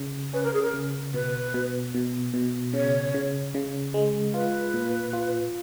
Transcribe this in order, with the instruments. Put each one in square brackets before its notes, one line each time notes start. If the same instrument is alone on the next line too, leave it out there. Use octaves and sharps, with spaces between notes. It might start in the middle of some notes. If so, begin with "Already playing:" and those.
Already playing: [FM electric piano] C#3
[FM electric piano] C#4 [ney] B4
[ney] A#4
G#4
A#4
[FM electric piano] C#3
[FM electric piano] B2 [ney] B4
[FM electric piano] B2
B2
B2
[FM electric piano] C#3 [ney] C#5
[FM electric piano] C#3
C#3
G#3
[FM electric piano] F4 [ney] B4
[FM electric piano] A#2
F4